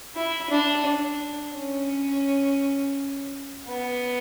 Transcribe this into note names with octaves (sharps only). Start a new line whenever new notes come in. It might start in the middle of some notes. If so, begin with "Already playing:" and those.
E4
D4
D4
C#4
B3